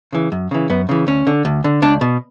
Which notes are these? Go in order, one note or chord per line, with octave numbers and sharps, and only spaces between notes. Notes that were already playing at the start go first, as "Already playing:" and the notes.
C#3 E3
F#2
C#3 E3
F#2 B3
C#3 E3
D2 C#4
D3
D2
D3
C#2 D4
B2